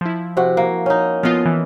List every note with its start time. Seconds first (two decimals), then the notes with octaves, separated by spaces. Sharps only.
0.01 F3 E4
0.37 C3 F#4
0.57 A#3
0.86 C#4 D#4
1.23 F3 B3 F4 D#5 F5
1.46 E3